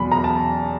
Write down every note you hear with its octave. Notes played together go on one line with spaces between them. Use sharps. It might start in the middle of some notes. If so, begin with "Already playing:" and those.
Already playing: E2 B2 F#3 B5
A#5
A5